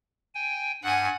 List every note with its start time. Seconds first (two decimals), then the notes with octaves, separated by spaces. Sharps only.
0.35 G5 G#5
0.83 G2 F#5 G#5